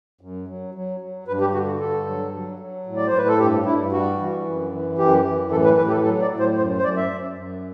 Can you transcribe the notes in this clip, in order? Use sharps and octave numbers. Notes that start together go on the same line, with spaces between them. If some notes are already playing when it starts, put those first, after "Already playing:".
F#2
F#3
F#3
F#3
G2 B4
G4
D3 F#4
F#4
G2 A4
F#3
F#3
F#3
A2
D5
C5
A2
B4
A4
G2 G4
G2 E4
G3 F#4
E3
F#2
E3
F#2 G4
E3
A2 A4
B4
A2 B4
G4
A4
F#3 A4
D5
A2
C5
F#2 C5
C5
F#2 D5
E5
F#2
F#2